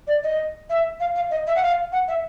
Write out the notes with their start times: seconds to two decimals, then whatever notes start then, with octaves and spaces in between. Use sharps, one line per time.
0.07 D5
0.23 D#5
0.69 E5
1.00 F5
1.15 F5
1.30 D#5
1.47 E5
1.55 F#5
1.62 F5
1.92 F#5
2.08 E5